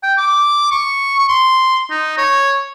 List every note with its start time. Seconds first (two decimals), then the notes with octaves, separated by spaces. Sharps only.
0.03 G5
0.18 D6
0.71 C#6
1.29 C6
1.90 D#4
2.18 C#5